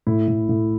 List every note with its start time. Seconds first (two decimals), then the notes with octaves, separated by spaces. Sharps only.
0.07 A2 E4
0.28 A2
0.49 A2